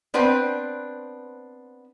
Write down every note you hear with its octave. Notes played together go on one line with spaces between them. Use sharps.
B3 C4 D4 B4 C5